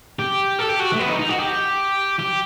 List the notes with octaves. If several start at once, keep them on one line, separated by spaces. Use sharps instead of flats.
G4
A4
G4
F#4
A3
B3
D#4
D#4
F#4
G4
G4